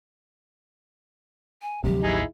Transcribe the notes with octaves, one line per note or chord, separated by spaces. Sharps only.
G#5
D2 C3 F3 F#3 G4
A1 D#2 D#4 E4 G#4